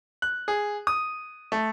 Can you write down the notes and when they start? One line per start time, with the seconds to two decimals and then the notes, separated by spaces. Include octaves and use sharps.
0.22 F#6
0.48 G#4
0.87 D#6
1.52 A3